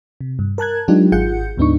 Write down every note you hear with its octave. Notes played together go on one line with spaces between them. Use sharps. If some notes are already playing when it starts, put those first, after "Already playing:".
C3
G2
A#4 A5 F#6 G#6
F#3 G#3 D4 D#4 F4 G4
G#1 F4 G#4 F#5 G6 C#7
D2 G#2 B3 D4 D#4 C#6